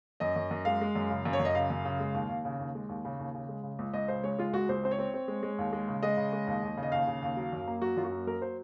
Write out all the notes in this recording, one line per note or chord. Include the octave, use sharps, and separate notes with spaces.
F#2 D#5
F#2
F#2
G#3 F5
G#3
F#2
C#3
F#2
C#5
F#2
D#5
C#3 F5
F#2
C#3
G#3
D#2
D#2
C#3
D#2
G#3
D#2
C#3
D#2
C#3
G#3
C#3
C#2
C#2 D#5
C#3 C5
G#3 C#5
G#3 F4
C#2 F#4
C#2 C5
C4 C5
C#5
C4
C4
G#3
G#3
D#2
G#3
C#3
G#3 D#5
C#3
G#3
D#2
D#2
C#3
D#5
D#2 F5
C#3
D#2
F#3
F#2
A#3
F#3 F#4
F#2 F4
F#4
A#3
F#3 A#4
C5